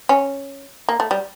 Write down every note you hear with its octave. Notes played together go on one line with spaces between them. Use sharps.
C#4
A#3
A3
G3